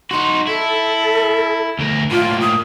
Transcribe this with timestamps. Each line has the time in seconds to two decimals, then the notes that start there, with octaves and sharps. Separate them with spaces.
0.11 D#4 F#4 C6
0.47 E4 A4
1.79 D2 A#4
2.11 A2 A#3 F4
2.41 D#6